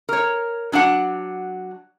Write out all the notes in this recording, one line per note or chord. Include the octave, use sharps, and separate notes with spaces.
A#4 C#5
F#3 D4 F#4 F#5